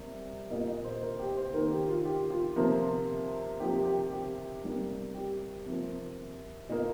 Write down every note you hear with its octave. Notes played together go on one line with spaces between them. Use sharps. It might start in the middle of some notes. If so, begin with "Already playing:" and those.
Already playing: C3 G3 A#3
A#2 A#3 D#5
D#5
C5
A#4
G4
C5
D#3 A#3 A#4
G4
F4
G4
F4
C3 F3 A#3
C3 F3 A#3 G4
G4
G4
G4
C3 G3 A#3
G4
C3 F3 A#3
A#2 A#3 D#5